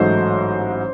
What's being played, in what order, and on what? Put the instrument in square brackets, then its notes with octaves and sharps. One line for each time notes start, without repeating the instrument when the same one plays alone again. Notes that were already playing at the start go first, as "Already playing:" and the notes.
Already playing: [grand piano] A1 G#2 F#3 A3 D#4 C5